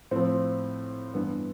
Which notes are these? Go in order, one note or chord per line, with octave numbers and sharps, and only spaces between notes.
A2 F3 C4
G2 E3 B3